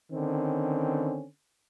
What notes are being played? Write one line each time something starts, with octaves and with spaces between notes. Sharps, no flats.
D3 D#3 C4 C#4